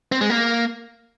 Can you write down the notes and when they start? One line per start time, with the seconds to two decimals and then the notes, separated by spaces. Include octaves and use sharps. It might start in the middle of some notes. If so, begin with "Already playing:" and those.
0.12 C4
0.21 G#3
0.30 A#3